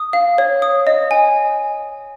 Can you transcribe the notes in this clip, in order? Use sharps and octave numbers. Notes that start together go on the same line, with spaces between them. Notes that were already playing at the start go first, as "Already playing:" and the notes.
Already playing: D#6
F5
C#5
D#6
D#5
G#5